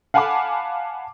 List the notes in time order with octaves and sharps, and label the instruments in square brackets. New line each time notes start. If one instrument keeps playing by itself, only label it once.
[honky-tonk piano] F5 F#5 G#5 A5 B5 D6